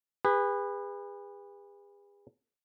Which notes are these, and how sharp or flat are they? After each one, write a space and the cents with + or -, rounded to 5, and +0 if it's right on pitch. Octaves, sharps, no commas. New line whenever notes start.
G#4 -40 B4 +0